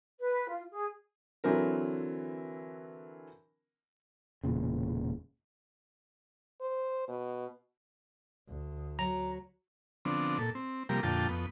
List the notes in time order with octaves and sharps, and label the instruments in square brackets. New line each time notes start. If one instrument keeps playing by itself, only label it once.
[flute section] B4
F4
G#4
[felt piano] D3 E3 F#3 C4 A#4
[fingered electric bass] E1 E2 A#2 C#3
[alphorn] C5
B2
[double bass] D2
[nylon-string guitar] F#3 [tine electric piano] A#5
[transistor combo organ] D3 F3 B3 C4 D4
A#2 A4
C4
C3 F3 G3 A#3 G4 A#4
F2 A#2 D3 F4 G5 A5
F2 B3